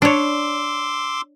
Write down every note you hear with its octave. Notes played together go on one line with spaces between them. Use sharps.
D4 C#5 C6 D6 E6